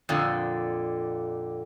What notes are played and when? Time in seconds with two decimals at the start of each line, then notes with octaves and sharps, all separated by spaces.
0.09 F2 A#2 D3